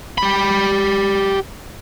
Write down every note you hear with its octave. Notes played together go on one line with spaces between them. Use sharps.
G4 B5